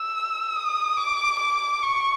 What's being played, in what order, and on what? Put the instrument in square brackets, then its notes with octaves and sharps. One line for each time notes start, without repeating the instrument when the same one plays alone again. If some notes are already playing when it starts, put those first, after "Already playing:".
Already playing: [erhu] E6
D#6
D6
D6
C#6